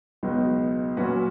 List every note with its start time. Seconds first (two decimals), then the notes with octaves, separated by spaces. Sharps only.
0.23 C#2 B2 F#3 B3 D#4
0.97 A#2 F#3 C#4 F#4 B4